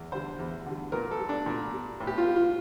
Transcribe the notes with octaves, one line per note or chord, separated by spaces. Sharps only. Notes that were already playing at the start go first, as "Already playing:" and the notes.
Already playing: E2
D3 G3 C5
E2
D3 G3
A#2 A#4
A4
G3
D4
A#2
G3
A2
G4
F4
G3
F4